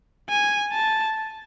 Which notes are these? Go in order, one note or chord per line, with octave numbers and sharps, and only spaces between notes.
G#5
A5